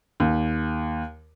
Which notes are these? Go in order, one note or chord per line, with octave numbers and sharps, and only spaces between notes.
D#2